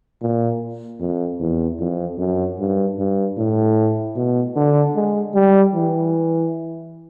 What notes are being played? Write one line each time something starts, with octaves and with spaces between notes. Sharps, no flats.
A#2
F2
E2
F2
F#2
G2
G2
A2
B2
D3
G#3
G3
E3